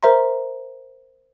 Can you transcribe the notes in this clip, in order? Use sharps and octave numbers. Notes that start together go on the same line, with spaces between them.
A#4 C5 E5 A#5 C6